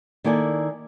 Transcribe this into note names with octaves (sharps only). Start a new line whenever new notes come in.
D#3 A#3 E4 A4 D5 G#5